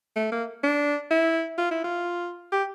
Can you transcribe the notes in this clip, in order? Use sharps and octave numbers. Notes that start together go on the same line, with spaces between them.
A3
A#3
D4
E4
F4
E4
F4
G4